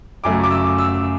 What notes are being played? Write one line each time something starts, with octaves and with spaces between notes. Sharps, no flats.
F#2 C#3 F#3 A3 D6
D6
E6
E6